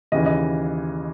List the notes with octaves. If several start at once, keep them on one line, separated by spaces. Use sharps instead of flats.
D#2 C#3 E3 D#5
D#5